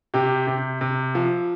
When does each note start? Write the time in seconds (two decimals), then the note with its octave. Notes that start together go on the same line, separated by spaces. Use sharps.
0.14 C3 G4
0.47 C3
0.81 C3
1.15 F3